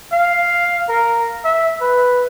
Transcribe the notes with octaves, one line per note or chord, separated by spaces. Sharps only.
F5
A#4
E5
B4